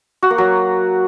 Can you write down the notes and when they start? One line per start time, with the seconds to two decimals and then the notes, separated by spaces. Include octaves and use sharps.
0.23 F#4
0.30 A#3
0.38 F#3